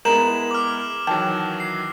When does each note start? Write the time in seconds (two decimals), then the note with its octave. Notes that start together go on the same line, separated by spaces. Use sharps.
0.05 G#3 B3 E4 A#4 A#5 E7 F#7
0.51 D6 F6
1.07 D#3 E3 F#3 G5 A5
1.60 C7